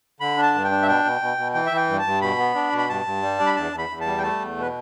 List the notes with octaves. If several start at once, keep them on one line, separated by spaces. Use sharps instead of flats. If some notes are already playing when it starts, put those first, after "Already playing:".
D3 B5
D4
A5
G2
G5
D4
E5
B2 G5
B2
B2
B2
E3 G5
E5
E3
G5
G2
A5
G2
B2 B5
B3
D4
B2
B5
G2 A5
G2
G3
D4
B5
E2 A5
E2
B5
E2
A5
G3
G5
A3 A5
E2
B2 B4